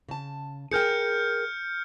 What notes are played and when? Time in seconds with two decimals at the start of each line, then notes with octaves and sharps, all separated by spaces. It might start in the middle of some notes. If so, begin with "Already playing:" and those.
0.08 C#3 A5
0.71 G#4 A#4 G5 F6 G6 C#7